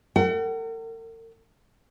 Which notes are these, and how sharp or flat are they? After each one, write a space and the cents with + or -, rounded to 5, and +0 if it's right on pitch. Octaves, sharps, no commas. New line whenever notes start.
A#4 -45 F#5 +40